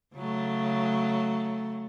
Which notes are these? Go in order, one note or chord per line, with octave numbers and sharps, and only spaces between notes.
C#3 F#3 A3